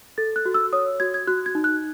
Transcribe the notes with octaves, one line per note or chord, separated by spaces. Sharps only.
A4 A6
F#6
F#4
E6
C#5 D#6
F#4 G#6
G#6
F#4 F#6
G#6
D#4
F#6